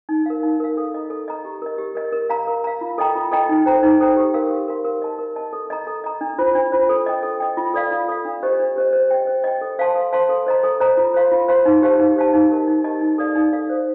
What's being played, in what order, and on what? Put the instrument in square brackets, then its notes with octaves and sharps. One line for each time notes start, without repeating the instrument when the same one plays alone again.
[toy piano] D#4
A#4 F5
D#4
A#4 F5
A4
D#5 A#5
A4
D#5 A#5
G4
A#4 D#5
G4
A#4 D#5
A#4
F5 A#5
A#4
F5 A#5
F4
A4 D#5 G5 A#5
F4
A4 D#5 G5 A#5
D#4
A4 C5 G5 A#5
D#4
A4 C5 G5 A#5
G4
A#4 F5 C6
G4
A#4 F5 C6
A#4
D#5 A5
A#4
D#5 A5
A4
D#5 A#5
A4
D#5 A#5
D4
F4 C5
D4
F4 C5
A4
D#5 G5
A4
D#5 G5
F4
A4 D5 F5
F4
A4 D5 F5
D4
G4 C5 D#5
D4
G4 C5 D#5
C5
D#5 G5
C5
D#5 G5
A4
C5 F5 A5 C6
A4
C5 F5 A5 C6
A4
C5 D#5 A#5
A4
C5 D#5 A#5
F4
C5 F5 C6
F4
C5 F5 C6
D#4
G4 C5 F5 A5
D#4
G4 C5 F5 A5
D#4
G4 A#4 D#5 A5
D#4
G4 A#4 D#5 A5
D#4
A4 D5 F5
D#4
A4 D5 F5
C5